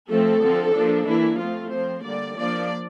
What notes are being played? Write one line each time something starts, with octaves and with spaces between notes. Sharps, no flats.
F3 A3 C4 A4
D3 F3 C4
F3 A#3 D4
E3 A#3 D4 E4
F3 A3 C4 F4
F3 C4 C5
D3 G3 A#3 D5
F3 A#3 D4 D5